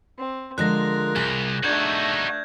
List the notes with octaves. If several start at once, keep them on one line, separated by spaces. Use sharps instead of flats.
C4
D3 F3 G#3 F4 A#4 F#6 A#6
C2 G#4
A3 D4 D#4 F#4 G6 G#6